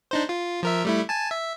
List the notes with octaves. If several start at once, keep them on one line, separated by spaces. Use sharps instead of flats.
D4 D#4 C5
F4
F3 A#4 E5
G3 A3 E4
G#5 A5
E5